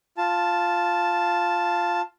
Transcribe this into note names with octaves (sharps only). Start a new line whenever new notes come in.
F4 A5